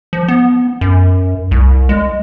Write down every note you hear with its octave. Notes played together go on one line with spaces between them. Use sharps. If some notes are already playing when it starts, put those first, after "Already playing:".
F3
B3
F#2
C2
G#3